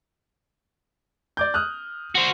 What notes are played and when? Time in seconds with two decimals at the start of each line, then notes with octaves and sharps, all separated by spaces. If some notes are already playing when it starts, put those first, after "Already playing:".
1.37 D5 D6 G6
1.54 D#6 F6 F#6
2.15 F#4 C5